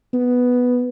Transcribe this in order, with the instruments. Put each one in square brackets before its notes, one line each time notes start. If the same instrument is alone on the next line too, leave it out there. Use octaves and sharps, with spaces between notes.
[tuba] B3